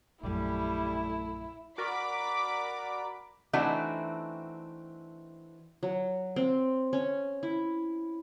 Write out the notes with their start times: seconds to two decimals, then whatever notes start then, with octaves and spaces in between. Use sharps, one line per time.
0.23 A#1 F#2 G3 A3 E4
1.78 F#4 A#4 D5 B5 D6
3.53 E3 A3 C4 D4 D#4 F#4
5.83 F#3
6.36 C4
6.93 C#4
7.43 E4